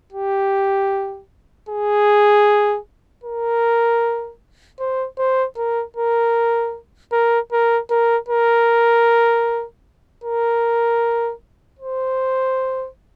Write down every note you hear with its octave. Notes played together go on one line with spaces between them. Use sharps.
G4
G#4
A#4
C5
C5
A#4
A#4
A#4
A#4
A#4
A#4
A#4
C5